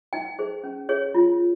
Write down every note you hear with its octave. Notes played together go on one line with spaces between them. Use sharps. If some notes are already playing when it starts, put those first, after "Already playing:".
D#4 G5
G#4 C5
C#4
G#4 C#5
F4